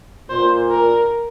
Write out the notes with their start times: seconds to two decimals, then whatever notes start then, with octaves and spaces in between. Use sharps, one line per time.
0.29 A#2 C5
0.70 A#4